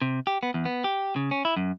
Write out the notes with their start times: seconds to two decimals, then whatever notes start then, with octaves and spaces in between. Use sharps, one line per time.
0.02 C3
0.27 G4
0.43 B3
0.54 E2
0.65 B3
0.84 G4
1.16 C#3
1.31 C#4
1.45 E4
1.56 F#2